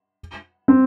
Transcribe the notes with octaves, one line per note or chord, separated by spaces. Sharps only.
C4